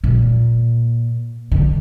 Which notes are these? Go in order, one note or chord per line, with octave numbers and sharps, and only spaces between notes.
A#2
D3